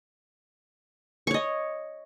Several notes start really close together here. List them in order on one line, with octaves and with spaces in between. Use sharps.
C#6 C#5 D#5